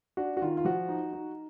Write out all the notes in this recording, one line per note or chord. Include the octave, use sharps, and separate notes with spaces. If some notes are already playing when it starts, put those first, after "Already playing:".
D4 F#4
F#4
D#3 F4
F4
F3 F#4
D#4
D#4